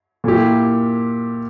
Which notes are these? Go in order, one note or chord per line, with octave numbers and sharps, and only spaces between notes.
A#2 A#3 E4 G4